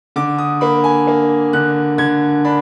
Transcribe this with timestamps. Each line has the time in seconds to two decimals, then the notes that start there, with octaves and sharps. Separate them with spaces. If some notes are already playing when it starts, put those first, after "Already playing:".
0.16 D3 D6
0.38 D#6
0.61 A#3 B5
0.84 G#5
1.07 A#3
1.53 D3 F#6
1.98 D3 G#6
2.45 D4 B5